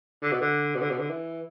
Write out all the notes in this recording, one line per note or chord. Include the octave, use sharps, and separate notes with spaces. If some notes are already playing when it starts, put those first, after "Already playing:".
D3
B2
D3
B2
D3
B2
D3
E3